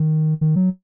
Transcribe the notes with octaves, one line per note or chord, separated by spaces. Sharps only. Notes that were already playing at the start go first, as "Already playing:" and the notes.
Already playing: D#3
D#3
F#3